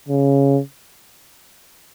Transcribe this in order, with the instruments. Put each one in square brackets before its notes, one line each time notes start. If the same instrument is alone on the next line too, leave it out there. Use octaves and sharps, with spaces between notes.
[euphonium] C#3